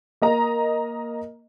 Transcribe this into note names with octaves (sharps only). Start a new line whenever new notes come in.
A#3 D#5 A#5